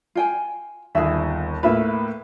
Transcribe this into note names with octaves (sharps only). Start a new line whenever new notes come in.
F4 G5 G#5
G1 D#2 G#4 E5
A2 A#3 F4 B4 E5